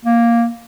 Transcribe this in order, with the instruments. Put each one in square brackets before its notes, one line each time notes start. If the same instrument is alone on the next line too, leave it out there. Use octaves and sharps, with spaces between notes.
[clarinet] A#3